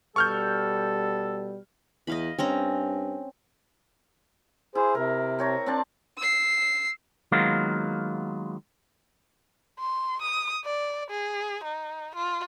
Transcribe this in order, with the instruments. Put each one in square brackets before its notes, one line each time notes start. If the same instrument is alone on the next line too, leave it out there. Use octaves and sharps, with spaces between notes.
[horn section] B2 G3 [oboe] A4 [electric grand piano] C#6 F6 G6
[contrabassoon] E2 [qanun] D#5 F5 B5
[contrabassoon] G2 [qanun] C4 C#4 A#5
[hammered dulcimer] E4 [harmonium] G#4 C5
[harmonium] C3 [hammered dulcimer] A#4
[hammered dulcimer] C4 C#5 A#5
C4 D4 A5
[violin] E6 C7
[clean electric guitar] D#3 F#3 G#3 A#3 B3 F4
[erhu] C6
D#6
D5
G#4
D#4
F4